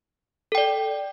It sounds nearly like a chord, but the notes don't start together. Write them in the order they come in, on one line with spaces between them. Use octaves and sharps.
A4 G5 D5